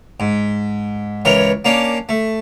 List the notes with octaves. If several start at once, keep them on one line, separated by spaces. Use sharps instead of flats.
G#2
C#2 E3 A#4 C#5
A#3 C#4 D4
A3